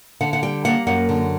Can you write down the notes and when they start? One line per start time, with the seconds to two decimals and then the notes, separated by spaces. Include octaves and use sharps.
0.21 D3 F#5
0.33 F#5
0.43 G3 G5
0.65 A#3 F#5
0.87 F#2 F#5
1.09 D3